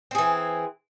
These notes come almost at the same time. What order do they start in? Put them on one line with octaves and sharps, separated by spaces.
C4 G#4 E3